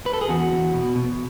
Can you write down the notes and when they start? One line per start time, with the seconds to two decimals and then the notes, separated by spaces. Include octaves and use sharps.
0.06 B4
0.13 A4
0.21 G#4
0.29 E2 F#4
0.52 E2
0.74 B2
0.96 B2